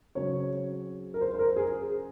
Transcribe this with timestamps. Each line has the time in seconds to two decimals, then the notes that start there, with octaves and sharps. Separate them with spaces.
0.15 C#3 F#3 C4 C#5
1.14 A#4
1.21 C5
1.34 C5
1.39 A#4
1.56 G#4